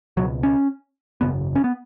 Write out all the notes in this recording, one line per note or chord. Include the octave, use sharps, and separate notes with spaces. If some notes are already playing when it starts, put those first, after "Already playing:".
C#2 B2 F#3
C#4
G#1 F#2 C#3 B3
C#4
B3